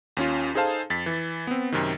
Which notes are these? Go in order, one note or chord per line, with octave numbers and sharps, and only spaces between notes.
D#2 C#4 F4
D#4 G#4 A4 C5 F5 A5
F2 A6 B6
E3
B3 C4
F#2 C3 D#3